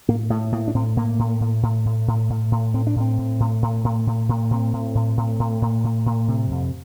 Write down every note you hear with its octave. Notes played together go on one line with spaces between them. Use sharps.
A2 A#3
A2 A3
A2 A#3
D4
A2 C4
A2 A#3
A2
A2
A2
A2
A2
A2
A2
A2 C4
D4
A2 C4
A2
A2
A2
A2
A2
A2
A2 C4
A2
A2
A2
A2
A2
A2
A2
C3
F2